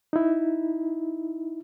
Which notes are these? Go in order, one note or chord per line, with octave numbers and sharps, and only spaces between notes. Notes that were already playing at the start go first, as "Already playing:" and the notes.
D#4 E4